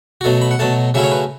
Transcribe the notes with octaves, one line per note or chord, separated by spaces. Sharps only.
F#4
B2 F#3 A3 A4
B5
F#5
B2 F#3 A3 A5
C#3 F#3 A3 C#4 E4 E5
C#5
B4